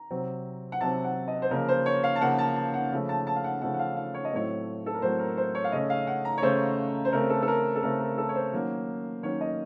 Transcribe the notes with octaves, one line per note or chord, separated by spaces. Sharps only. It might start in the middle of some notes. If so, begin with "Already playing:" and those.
Already playing: A#5
C3 F#3 C4
F#5
C3 F#3 C4 A5
F#5
D#5
C5
C#3 F3 A#3 A#4
C5
C#5
F5
A5
C#3 F3 A#3 F#5
A5
A5
F#5
C#3 F3 A3
A5
A5
F5
F#5
C#3 F3 A3 F#5
F#5
F5
F5
C#5
D#5
A2 F#3 A3 C4 C#5
A4
A#4
A2 F#3 A3 C4 C5
A#4
C5
C#5
F5
C#3 A3 C#4 D#5
F5
F#5
A#5
C#5
C#3 A3 C#4 C5
C5
C#3 A3 C4 A#4
A4
A4
A#4
A4
C#3 A3 C4 A#4
A#4
A4
C#5
C5
D#3 F#3 A#3 C#4
D#3 F#3 A#3 C#4 C#5
D#5